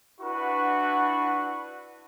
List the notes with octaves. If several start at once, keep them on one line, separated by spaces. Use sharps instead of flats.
D4 E4 F#4 B4 F#5 C#6